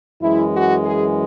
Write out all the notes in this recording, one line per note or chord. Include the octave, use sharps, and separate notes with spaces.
F#2 E3 G#3 E4
F#4
G#4